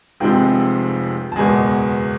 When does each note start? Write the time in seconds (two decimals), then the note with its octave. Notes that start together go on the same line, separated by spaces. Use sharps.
0.20 F1 F2 C3 F3 G#3 G5
1.32 A5
1.36 F#1 E2 B2 G#3 G#5